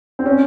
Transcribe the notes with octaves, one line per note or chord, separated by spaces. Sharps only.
C4
C#4